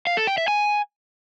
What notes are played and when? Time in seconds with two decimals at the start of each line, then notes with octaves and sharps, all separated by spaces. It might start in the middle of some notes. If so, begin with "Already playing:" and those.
0.07 F5
0.17 A4
0.27 G5
0.38 E5
0.48 G#5